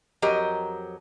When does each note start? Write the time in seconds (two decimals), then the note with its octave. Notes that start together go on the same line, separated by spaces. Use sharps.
0.22 F2 F#3 G4 A#4 D#5 A#5